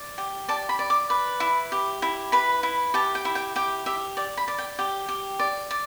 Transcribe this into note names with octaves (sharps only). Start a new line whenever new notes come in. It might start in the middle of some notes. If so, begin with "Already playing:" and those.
Already playing: D5
G4
D5 A5
B5
D5
D6
B4
E4
G4
E4
B4 B5
E4
G4 A5
G5
E4
G5
G4 G5
G4 E5
D5 G5
B5
D5
G5
G4 G5
G4
D5
D5